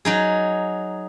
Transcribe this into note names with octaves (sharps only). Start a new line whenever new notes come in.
F#3 D#4 G#4